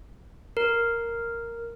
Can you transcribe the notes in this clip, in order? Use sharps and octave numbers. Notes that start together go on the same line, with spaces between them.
A#4